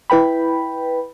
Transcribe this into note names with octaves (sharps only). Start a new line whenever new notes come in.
E4 B4 G5 B5